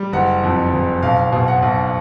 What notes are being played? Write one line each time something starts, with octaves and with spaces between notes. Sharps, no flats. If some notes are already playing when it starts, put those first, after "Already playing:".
Already playing: G3
F#1 F#5
F2
F#1
B1 F5
B2
F#5
B1